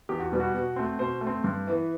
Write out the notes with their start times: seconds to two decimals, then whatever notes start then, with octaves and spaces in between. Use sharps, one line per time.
0.09 E2 G4
0.20 F#4
0.32 B2 G3 B3
0.40 F#4
0.54 B2
0.76 A3 C4
0.99 B2 C5
1.21 A3
1.27 C4
1.44 G2
1.67 E3 B3